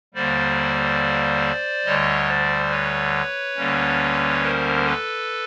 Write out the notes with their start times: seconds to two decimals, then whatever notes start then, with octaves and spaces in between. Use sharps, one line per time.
0.14 D#2 D3 G3 A#3 C5 D5
1.85 D2 D3 G3 C#5 D#5
2.28 C5 D5
2.70 B4 C#5
3.56 D2 D3 G3 A#3 C#4
4.42 A#4 C5
4.85 A4 B4